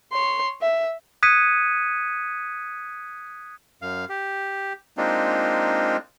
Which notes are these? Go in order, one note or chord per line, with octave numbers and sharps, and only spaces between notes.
C#5 C6
E5
D#6 F#6 G#6 B6 C#7 D#7
F#2 F5
G4
G#3 A#3 C4 D4 D#4 F4